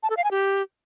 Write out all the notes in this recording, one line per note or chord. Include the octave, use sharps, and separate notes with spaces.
A5
A4
F5
G#5
G4